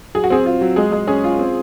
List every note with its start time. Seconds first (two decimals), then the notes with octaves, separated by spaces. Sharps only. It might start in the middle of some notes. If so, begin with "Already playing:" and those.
0.15 F#3 G#4
0.24 F#4
0.30 C4 G#4
0.46 F4
0.61 F#3
0.76 G#3 G#4
0.92 G#3
1.07 C#4 G#4
1.24 F4
1.39 C4